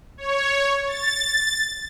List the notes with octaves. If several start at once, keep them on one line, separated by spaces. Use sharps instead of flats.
C#5
A6